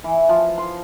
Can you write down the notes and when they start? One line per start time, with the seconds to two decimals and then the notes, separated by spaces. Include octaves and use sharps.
0.04 E3
0.29 F3
0.58 C6